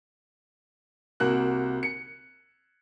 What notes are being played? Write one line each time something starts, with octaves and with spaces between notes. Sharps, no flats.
C2 A#3 F#4 F#6
C#7